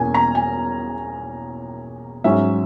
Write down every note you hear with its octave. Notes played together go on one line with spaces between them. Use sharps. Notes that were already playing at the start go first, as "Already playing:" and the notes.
Already playing: E2 B2 A#3 C#4 G#5
A#5
G#5
G#2 F#3 C#4 E5